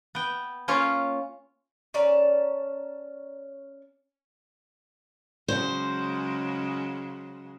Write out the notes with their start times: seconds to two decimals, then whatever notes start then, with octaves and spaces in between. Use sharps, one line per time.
0.15 B3 G5
0.68 A#3 C#4 F4 C#5 F5
1.94 C#4 D5 A5 A#5
5.48 C#3 F#3 G#3 C5